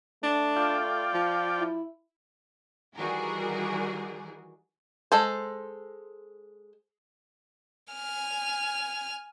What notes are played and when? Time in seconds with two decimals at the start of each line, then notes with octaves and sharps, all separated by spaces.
0.23 A3 D4
0.56 F4 D5 G5
1.14 F3
1.59 E4
2.96 D#3 E3 G3 F#4 G#4 A#4
5.12 G#3 A4 C5
7.93 G#5 F6